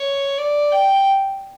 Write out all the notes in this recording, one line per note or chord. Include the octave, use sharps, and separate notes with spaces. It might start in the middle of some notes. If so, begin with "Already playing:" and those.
Already playing: C#5
D5
G5